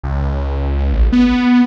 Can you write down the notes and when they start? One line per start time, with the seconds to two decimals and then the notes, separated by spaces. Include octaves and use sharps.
0.03 C#2
0.93 A1
1.12 B3